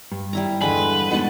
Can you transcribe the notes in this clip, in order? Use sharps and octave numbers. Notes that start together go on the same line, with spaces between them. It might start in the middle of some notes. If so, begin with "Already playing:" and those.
G2
G3 E4 A#5
E2 G2 D3 G#3 B4 G#5
B2 G#3 D#4 A5